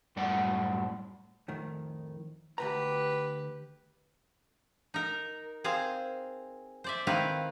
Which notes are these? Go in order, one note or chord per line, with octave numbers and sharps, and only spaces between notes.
F#2 A2 G3 D5 F#5
F2 A2 D#3
D2 G2 G4 B4 A#5
D#4 A#4
C4 G#4 C5 F5
C5 D5 E5
D#3 C4 E4 B4 F5